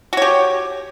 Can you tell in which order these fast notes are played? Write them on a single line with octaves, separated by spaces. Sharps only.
F#4 C#5 G4